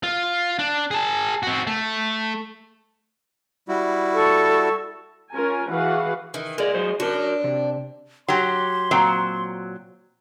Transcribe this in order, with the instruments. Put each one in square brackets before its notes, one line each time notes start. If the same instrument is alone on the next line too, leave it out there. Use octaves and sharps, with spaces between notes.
[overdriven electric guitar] F4
D4
G#4 A5
C4 F#4
A3
[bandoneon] G3 E4 F#4
[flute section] A4 C#6
[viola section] C#4 F4 A#4 G#5
E3 F#4 G#4 B4 F5 F#5
[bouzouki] D#3 E3
[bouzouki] G#3 [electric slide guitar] A#4 D5
[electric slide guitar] F#3 C5
[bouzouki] D4 [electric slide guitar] F#4 A#4
[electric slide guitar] C3
[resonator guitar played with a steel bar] F#3 G4 [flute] C6
[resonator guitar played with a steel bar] A#2 F#3 C4